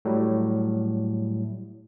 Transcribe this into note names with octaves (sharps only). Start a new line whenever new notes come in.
A2 F#3 G3